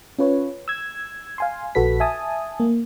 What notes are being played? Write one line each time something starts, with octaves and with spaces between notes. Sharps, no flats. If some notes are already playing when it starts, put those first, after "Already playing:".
C#4 F4 B4 C#5
E6 G#6
F5 G#5 C6
A#1 F#4 A4 B4 B6
E5 G#5 A5 D#6
A#3